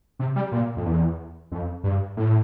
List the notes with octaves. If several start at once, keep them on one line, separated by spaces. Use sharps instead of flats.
C3
G3
A#2
F2
E2
F2
G2
A2